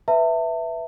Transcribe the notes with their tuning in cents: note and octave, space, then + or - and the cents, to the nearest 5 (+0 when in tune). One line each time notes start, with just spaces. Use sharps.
B4 +0 E5 +0 A5 +40